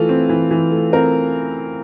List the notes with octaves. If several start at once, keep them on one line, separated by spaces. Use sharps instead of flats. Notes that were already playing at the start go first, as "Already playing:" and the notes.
Already playing: E3 A3 F4
C4
E3
E3
A3
C4 A#4